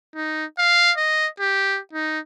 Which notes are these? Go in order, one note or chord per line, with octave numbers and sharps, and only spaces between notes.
D#4
F5
D#5
G4
D#4